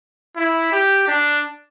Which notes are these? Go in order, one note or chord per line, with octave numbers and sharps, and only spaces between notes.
E4
G4
D4